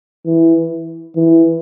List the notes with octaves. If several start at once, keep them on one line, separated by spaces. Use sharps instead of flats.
E3
E3